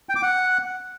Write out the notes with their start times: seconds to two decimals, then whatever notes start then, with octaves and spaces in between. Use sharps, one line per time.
0.09 G5
0.16 D6
0.23 F#5